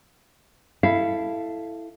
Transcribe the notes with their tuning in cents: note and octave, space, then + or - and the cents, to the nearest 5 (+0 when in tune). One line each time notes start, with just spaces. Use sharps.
E4 +0 A4 +0 F5 -20